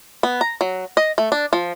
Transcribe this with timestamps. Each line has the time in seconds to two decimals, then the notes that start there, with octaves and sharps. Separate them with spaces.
0.23 B3
0.41 A#5
0.61 F#3
0.97 D#5
1.18 A3
1.32 D4
1.53 F3